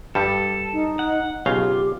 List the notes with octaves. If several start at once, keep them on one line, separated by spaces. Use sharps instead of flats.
G2 G3 A4
D#4
F#5
B1 C#3 F4 G4 F5